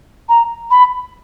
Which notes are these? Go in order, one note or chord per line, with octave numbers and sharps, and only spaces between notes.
A#5
B5